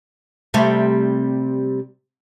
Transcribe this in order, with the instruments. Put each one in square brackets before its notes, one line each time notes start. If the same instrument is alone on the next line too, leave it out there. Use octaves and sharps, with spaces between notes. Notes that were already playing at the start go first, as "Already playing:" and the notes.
[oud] C3 G3 A3